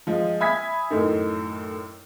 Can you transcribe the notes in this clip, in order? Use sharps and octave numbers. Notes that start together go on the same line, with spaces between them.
F3 G#3
E5 G#5 B5 D#6 G#6 B6
F#2 A2 D#3